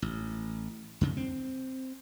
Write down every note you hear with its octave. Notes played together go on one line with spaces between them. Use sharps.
A1
F2 C#3
C4